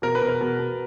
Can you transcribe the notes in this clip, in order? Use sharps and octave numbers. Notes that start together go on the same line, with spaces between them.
B2 A#4
B4
B2
A#4
B2
B2